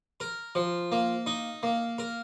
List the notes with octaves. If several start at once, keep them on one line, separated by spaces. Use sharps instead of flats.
A#4
F3
A#3
D#4
A#3
A#4